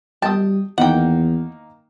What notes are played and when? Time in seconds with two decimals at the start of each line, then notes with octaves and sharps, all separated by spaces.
0.22 G3 G5 A5 D#6
0.78 E2 D#3 A#3 D#4 F#5 G5